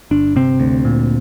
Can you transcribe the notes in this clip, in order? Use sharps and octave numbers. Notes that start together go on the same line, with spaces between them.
G1 D4
C3 C4
D2
A#2